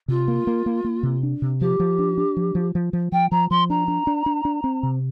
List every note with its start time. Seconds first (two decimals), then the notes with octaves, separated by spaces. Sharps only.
0.08 C3 F4
0.28 A#3
0.47 A#3
0.66 A#3
0.84 A#3
1.03 C3
1.23 D4
1.42 C3
1.60 F3 G4
1.80 F3
1.99 D4
2.18 D4
2.37 F3
2.55 F3
2.75 F3
2.93 F3
3.12 F3 G5
3.31 F3 A#5
3.50 F3 C6
3.70 D4 A#5
3.88 D4
4.07 D4
4.26 D4
4.45 D4
4.64 C4
4.83 C3